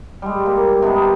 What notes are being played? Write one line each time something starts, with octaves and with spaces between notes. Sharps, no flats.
G3 G#3
A#3
C3 B3 D4 D#4